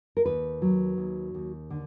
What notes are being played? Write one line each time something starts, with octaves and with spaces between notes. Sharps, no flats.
A#4
D#2 B4
F#3
D#2
D#2
D3